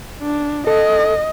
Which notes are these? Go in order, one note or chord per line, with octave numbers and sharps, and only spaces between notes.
D4
A4 D#5